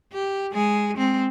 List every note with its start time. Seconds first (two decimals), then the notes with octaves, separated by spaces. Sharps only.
0.13 G4
0.51 G#3 G#4
0.97 G#3 C4